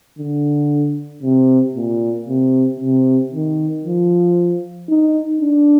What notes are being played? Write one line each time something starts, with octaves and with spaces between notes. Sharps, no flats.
D3
C3
A#2
C3
C3
D#3
F3
D#4
D4